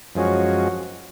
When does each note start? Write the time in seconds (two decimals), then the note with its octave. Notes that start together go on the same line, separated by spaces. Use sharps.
0.15 F#2 F3 G#3 C#4 F#4